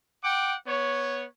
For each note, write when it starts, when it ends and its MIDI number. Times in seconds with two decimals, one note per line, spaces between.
0.23 0.54 78
0.23 0.54 79
0.23 0.54 86
0.67 1.25 59
0.67 1.25 73